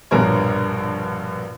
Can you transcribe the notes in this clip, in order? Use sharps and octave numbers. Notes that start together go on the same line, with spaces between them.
A#1 G2 B2 A#4 C#5